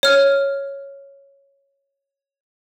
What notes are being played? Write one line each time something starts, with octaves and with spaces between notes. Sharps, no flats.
C#5 F6